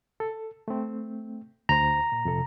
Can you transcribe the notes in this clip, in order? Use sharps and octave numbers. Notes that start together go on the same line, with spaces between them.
A4
A3 C4
D2 C5 A#5
A#2
F2 C3 A4